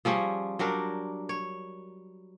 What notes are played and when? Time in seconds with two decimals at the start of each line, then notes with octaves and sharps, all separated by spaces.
0.05 F3 G3 C#4 G#4
0.59 F#3 G3 D4 A#4
1.29 C#5